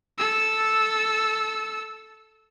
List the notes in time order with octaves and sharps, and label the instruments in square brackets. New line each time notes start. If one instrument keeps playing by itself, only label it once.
[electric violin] A4 E6